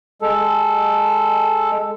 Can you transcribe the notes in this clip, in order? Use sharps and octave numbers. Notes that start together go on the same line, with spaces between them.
G#3 A4